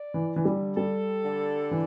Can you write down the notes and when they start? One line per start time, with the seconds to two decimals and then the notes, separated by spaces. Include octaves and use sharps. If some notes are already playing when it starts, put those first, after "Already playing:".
Already playing: D5
0.14 E3
0.30 D3
0.36 E3
0.45 G3
0.77 G3 A4
1.24 D3
1.71 E3